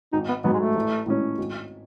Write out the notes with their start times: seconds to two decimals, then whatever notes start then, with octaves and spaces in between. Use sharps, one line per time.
0.13 G#1 D#4
0.28 B3
0.44 G#2 F#3 B3
0.53 G#3
0.60 A3
0.75 A1
1.06 A2 G#3 C#4
1.38 G#1